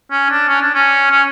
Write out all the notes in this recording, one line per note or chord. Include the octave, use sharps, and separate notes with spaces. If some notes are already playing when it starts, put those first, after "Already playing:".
C#4
D4
C#4
D4
C#4
C#4